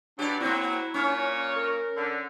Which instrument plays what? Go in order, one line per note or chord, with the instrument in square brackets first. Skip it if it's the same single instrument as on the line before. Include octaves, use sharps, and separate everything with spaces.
[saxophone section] E3 F#3 [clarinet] D4 [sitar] G4 D5
[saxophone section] F#3 [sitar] A#3 C4 [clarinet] E4
[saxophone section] A#2 C#5 [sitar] C#4
[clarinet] A#4
[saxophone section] D3